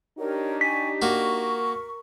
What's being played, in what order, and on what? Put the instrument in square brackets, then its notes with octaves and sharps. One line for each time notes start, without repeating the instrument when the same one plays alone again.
[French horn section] D4 D#4 G4 [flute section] A#4 C#5
[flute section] D5 G#5 C#6 [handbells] B6
[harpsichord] A#3 F#4 [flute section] A#4 C#6